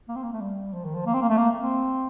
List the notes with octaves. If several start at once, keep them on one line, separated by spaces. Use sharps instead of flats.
A#3
C4
A#3
A3
G3
F3
D#3
F3
A#3
C4
A#3
A3
A#3
C4